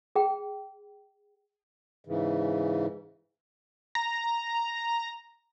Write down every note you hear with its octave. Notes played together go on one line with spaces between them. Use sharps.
G#4 G5
G#2 C#3 E3
A#5